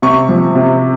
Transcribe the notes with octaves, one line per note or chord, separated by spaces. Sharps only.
C3 C#6
F3
C3